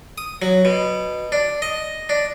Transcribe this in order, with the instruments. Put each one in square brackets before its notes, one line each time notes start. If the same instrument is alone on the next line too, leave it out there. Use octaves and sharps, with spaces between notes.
[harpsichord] D#6
F#3
B2
D4
D#5
D4